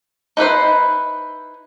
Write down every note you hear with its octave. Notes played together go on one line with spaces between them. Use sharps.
D#4 E4 B4 C5